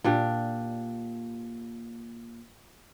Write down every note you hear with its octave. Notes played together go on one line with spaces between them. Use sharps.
A#2 D4 G4